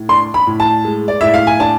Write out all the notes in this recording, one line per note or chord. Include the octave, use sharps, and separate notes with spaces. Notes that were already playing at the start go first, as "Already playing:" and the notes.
Already playing: A2
D4 C6
B5
A2
A5
G#3
D5
A2 E5
F5
G#5
D4 A5